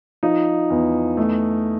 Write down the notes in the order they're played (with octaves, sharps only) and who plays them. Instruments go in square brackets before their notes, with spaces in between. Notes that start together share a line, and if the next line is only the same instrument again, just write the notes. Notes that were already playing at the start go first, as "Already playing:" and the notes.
[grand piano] F3 D#4
E2
A3